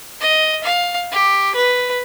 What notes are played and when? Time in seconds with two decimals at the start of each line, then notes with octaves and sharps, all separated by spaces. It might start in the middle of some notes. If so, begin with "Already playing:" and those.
0.21 D#5
0.64 F5
1.12 G4
1.55 B4